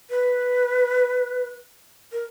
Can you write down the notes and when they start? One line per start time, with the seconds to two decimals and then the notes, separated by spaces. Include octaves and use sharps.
0.10 B4
2.12 A#4